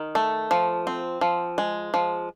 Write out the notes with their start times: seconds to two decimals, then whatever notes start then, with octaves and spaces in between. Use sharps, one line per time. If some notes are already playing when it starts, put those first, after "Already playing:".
Already playing: D#3
0.15 A3
0.51 F3
0.87 C4
1.21 F3
1.58 G#3
1.94 F3